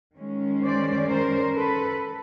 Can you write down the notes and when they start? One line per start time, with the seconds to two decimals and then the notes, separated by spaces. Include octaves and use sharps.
0.17 D#3 G#3 C#4
0.62 C5 D5
1.09 A#4 C5
1.56 A4 B4